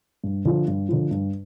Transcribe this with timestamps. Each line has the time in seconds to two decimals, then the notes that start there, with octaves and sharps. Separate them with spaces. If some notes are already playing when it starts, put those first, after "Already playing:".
0.24 G2
0.45 D3 F3
0.68 G2
0.89 D3 F3
1.11 G2